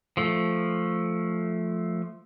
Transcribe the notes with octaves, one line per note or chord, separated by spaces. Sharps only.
F3 A3